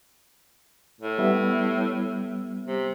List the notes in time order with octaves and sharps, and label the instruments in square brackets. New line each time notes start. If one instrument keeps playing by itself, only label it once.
[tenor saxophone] A2
[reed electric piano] G3 B3 E5
[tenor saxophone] C3